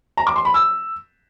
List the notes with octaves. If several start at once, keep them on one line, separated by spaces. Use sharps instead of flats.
A#5
D6
C6
B5
E6